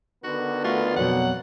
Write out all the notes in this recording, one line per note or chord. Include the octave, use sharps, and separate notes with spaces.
D3 D#3 B3 F#4
A3 F4 F#4
F2 B2 F#3 F#5